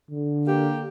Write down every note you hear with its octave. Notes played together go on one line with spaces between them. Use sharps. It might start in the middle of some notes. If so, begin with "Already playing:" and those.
D3
A#3 G4